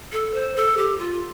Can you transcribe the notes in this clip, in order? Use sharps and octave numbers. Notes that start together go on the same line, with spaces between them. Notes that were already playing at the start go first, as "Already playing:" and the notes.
A4
C5
A4
G4
F4